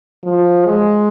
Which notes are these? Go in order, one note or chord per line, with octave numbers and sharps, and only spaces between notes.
F3
G#3